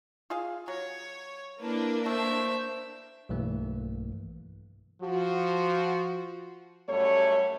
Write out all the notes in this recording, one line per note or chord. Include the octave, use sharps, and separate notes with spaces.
F4 G#4 F5
F#3 C#5
A#3 D4 E4 B4
A3 C5 E5
B1 G2 E3 A3 A#3
F3 F#4
F#2 G3 A3 C#5